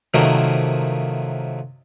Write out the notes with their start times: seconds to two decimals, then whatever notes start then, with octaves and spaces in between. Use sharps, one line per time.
0.14 C3 D#3 F3 F#3 A3 A#3